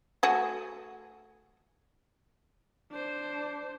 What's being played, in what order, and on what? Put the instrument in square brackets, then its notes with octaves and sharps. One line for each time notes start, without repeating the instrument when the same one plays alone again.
[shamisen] A3 F#4 G#4
[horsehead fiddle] D4 C5